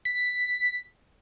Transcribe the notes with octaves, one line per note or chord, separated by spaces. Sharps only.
B6